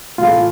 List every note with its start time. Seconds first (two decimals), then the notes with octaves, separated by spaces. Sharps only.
0.18 A2 E3 A3 F4